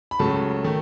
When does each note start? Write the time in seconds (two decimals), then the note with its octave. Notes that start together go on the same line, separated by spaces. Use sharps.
0.11 B5
0.19 C#2 C#3 F#3 A3 A5
0.64 D#3 A3